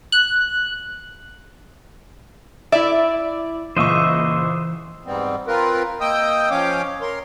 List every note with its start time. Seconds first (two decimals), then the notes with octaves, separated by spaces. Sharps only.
0.12 F#6
2.72 E4 D5 E5
3.77 C#2 A#2 E3 C5 D#5 E5 C#6
5.06 G#2 G3 B3 C4
5.47 C4 F4 A#4 B4
6.01 A#3 D#5 G5 D#6 E6 G6
6.50 F3 C#4 C#5 F5 G5 D6
7.01 A#4 C#5 C6